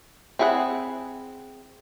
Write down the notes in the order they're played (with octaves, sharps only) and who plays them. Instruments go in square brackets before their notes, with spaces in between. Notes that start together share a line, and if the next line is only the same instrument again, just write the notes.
[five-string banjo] C4 E4 G#4 C5 F#5